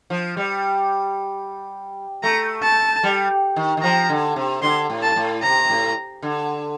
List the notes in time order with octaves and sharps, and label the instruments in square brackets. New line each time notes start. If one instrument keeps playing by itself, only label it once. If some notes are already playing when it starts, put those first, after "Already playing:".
[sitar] F3
G3
[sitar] A3 [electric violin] A#5
[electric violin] A5
[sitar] G3
D#3
D#3
[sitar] F3 [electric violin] A#5
[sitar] D3
C3
[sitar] D3 [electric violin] C6
[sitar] A2
[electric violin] A5
[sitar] A2
[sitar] C3 [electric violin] A#5
[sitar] A2
D3